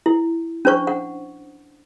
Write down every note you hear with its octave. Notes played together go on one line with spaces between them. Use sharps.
E4
C#4 D4 C5 C#6
F#5